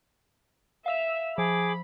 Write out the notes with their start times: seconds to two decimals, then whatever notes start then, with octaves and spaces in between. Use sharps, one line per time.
0.86 E5 F5 E6 F7
1.38 F3 G#4 B5 D6